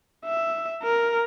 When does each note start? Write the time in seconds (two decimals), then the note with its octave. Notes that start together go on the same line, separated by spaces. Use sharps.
0.25 E5
0.83 A#4